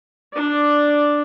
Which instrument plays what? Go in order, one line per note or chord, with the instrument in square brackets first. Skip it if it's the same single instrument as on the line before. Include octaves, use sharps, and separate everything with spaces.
[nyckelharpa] D4 D5